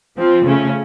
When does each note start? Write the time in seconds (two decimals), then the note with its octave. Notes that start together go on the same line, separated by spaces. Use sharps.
0.17 F3 C4 F4
0.45 C#3 A3 C#4